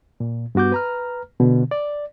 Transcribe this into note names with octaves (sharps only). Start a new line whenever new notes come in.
A#2
G2 B3 F#4 D6 G6
B4 A#5 F6
B2 D3
D5